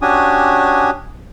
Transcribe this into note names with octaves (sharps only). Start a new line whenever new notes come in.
C#4 D4 F#4 G4 G#5 D#6